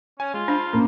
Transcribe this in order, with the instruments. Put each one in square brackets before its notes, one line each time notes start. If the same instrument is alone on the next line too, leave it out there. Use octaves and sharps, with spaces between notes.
[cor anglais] C#4 [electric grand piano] G#5
[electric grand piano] G#3 [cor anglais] F4
[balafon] D4 [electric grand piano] C5 F5 A5
[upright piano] A#2 A#3 [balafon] C#4